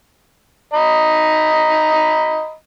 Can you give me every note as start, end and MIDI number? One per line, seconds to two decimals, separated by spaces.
0.73 2.53 75
0.73 2.53 82
0.73 2.53 83